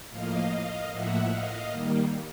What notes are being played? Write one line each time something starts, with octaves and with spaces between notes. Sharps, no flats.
A2 F3 A#3 D#5 F5
D#5 F5
A2 F3 A#3 E5 F#5
D#5 F5
D#3 G3 A#3